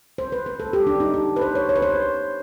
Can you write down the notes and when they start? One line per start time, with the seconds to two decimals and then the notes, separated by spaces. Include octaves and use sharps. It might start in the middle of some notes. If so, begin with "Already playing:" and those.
0.18 C5
0.32 B4
0.46 B4
0.60 A4
0.73 G4
0.87 D4
1.00 D#4
1.14 G4
1.36 B4
1.41 C5
1.55 C#5
1.69 C#5
1.76 B4
1.82 C5